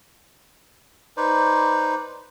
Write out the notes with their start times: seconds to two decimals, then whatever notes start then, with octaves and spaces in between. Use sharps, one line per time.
1.17 D#4 B4 C5 D5